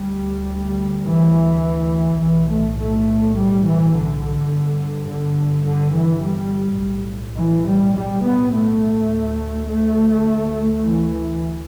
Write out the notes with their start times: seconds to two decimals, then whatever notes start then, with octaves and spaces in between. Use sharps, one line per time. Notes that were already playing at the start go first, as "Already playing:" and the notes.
Already playing: D2 G3
1.05 E3
2.20 B1 A2 E3
2.49 A3
2.78 A3
3.36 G3
3.64 E3
3.94 D3
4.51 G1 G2
5.08 D3
5.66 D3
5.94 E3
6.24 G3
6.81 B1 A2
7.38 E3
7.67 G3
7.96 G3
8.24 B3
8.53 A3
9.11 D2
9.68 A3
10.83 E3